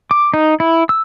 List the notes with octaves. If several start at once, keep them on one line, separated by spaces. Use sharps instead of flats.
D6
D#4
E4
E6